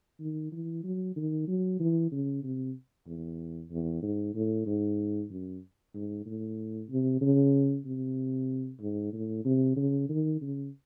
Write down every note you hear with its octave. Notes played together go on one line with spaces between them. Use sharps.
D#3
E3
F#3
D#3
F#3
E3
C#3
C3
E2
E2
G#2
A2
G#2
F#2
G#2
A2
C3
C#3
C3
G#2
A2
C3
C#3
D#3
C#3